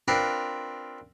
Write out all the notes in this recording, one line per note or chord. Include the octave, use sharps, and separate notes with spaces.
C4 D4 F4 A#4 B4